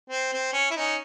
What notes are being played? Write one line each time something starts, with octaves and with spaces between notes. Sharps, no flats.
C4
C4
C#4
E4
C#4 D#4